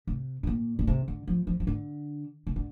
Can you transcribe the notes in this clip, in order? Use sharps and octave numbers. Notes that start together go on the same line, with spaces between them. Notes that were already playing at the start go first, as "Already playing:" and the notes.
C3
G2
A#2
A#2
C3
D3
F3
F3
F3
D3
C3
D3